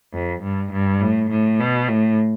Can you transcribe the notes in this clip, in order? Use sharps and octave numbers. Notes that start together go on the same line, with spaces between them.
F2
G2
G2
A2
A2
B2
A2